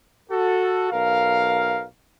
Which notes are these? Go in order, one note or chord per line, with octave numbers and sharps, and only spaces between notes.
F#4 A4
B1 A#4 F5